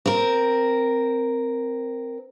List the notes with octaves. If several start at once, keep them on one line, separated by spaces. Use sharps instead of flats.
C4 A#4